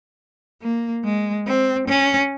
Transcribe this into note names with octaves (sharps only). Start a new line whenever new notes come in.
A#3
G#3
C4
C#4